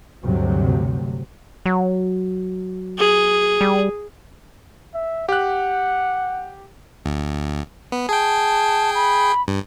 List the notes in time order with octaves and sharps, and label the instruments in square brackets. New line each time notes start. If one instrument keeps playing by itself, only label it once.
[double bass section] D2 G2 C3 F#3
[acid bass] F#3
[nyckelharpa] G#4
[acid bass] G3
[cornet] E5
[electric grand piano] G4 F#6 [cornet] F#5
[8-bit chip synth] D2
B3
[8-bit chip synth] G#4 G5 [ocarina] A5
[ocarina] B5
[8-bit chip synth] G2